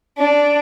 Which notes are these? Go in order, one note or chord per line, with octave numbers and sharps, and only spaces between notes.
D4